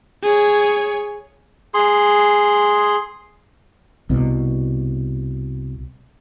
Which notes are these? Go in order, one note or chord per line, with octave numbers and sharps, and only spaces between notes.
G#4 C#5
G#4 C6
C2 B2